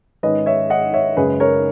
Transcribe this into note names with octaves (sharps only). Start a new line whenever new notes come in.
G#2 D#3 G#3 C#4 B4 D#5
C#5 E5
D#5 F#5
C#5 E5
F#2 C#3 G#3 C#4 G#4 B4
A#4 C#5